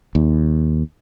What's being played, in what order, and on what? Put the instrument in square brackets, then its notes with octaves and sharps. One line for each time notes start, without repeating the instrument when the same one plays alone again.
[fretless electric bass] D#2